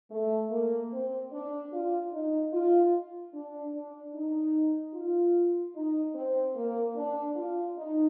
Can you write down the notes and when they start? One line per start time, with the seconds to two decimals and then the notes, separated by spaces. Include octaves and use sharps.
0.11 A3
0.51 A#3
0.92 C4
1.32 D4
1.72 F4
2.12 D#4
2.53 F4
3.34 D4
3.74 D4
4.14 D#4
4.94 F4
5.76 D#4
6.15 C4
6.55 A#3
6.96 D4
7.36 F4
7.77 D#4